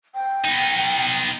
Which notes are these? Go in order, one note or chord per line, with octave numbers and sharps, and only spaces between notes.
G5
B3 D#4